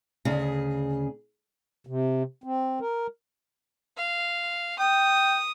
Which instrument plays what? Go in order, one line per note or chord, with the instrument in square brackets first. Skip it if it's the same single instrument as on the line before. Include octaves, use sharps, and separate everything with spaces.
[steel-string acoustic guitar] D2 C#3 G#4
[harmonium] C3
C4
A#4
[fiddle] F5
[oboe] G5 [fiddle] D#6